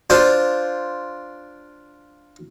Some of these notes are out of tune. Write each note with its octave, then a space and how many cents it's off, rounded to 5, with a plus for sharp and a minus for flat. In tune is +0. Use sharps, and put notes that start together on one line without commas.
D4 +0 F4 +0 C5 +0